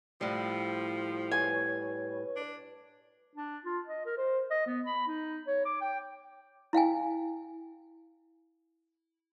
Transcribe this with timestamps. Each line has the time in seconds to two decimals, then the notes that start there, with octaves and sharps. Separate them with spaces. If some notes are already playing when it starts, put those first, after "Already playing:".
0.21 A2 F3 G3
1.31 B4 C#5 G#5
2.36 D4
3.35 D4
3.65 F4
3.86 D#5
4.06 A#4
4.18 C5
4.51 D#5
4.67 B3
4.86 B5
5.07 D#4
5.47 C#5
5.65 D6
5.81 G5
6.73 E4 F5 G5 G#5